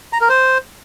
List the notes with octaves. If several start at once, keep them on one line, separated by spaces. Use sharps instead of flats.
A#5
A#4
C5